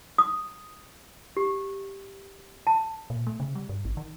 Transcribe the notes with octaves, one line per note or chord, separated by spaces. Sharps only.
D#6
G4
A5
A#2
A3
C#3
G3
G2
A1
D#3